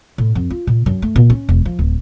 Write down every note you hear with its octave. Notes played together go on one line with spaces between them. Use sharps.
A2
F2
F4
A#2
F#2
A3
A#2
C#4
E1
F3
D1